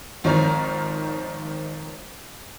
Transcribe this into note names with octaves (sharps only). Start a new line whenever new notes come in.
G#1 D#3 F3 C4 C#5 A#5